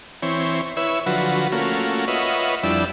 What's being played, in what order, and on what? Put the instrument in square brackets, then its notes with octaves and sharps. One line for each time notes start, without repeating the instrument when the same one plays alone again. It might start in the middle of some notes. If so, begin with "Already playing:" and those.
[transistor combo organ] E3 C4 C#5
E4 B4 C#5 E5
D3 F3 F#3 F#4 B4
A3 A#3 C#4 F4 F#4
F4 B4 C#5 D#5 E5 F#5
F2 G3 D4 E4 E6